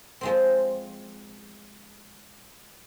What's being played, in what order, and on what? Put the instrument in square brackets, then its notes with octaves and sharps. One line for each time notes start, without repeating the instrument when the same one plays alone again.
[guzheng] F3 G#3 C4